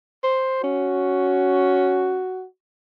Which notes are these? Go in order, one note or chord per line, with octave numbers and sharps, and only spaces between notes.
C5
C#4 F#4